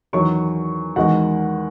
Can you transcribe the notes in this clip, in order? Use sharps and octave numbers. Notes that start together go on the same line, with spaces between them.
E2 D#3 F#3 C#5 C#6
E2 D#3 G#3 F#4 F#5